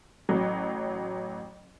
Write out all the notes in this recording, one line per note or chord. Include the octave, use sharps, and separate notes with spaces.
A1 F#3